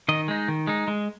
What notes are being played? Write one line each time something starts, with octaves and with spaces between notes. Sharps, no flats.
D#3 D#5
G#3 D#4
D#3
G#3 D#4
G#3